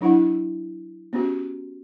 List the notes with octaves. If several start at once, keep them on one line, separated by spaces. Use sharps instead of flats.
F#3 D4 E4 F#5
B3 C#4 F#4 G4